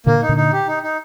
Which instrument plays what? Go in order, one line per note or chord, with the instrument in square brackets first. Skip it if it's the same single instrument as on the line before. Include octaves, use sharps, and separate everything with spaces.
[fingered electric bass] A#2 D3 [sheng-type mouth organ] A#3
[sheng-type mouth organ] D#4
[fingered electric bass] A#2 D3
[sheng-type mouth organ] D#4
G4
D#4
D#4